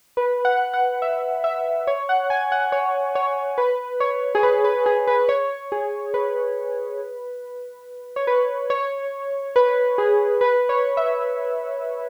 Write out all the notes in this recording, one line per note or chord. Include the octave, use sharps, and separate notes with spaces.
B4
F#5
F#5
E5
E5
C#5
F#5
G#5
F#5
C#5
C#5
B4
C#5
G#4
B4
B4
G#4
B4
C#5
G#4
B4
C#5
B4
C#5
B4
G#4
B4
C#5
E5